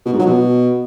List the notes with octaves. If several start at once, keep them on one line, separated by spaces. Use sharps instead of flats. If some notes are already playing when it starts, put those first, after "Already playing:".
B2
G#2
F#3
B2